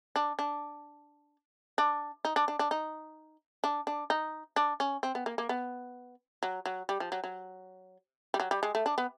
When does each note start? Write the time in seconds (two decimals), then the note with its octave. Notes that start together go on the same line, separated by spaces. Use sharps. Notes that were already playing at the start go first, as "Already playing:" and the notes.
0.16 D4
0.39 D4
1.78 D4
2.25 D#4
2.36 D4
2.48 D4
2.59 D4
2.71 D#4
3.64 D4
3.87 D4
4.10 D#4
4.56 D4
4.80 C#4
5.03 C4
5.15 B3
5.26 A#3
5.38 A#3
5.49 B3
6.43 F#3
6.66 F#3
6.89 G3
7.00 F3
7.12 F#3
7.24 F#3
8.34 G3
8.40 F#3
8.51 G3
8.63 G#3
8.75 A3
8.86 D4
8.98 B3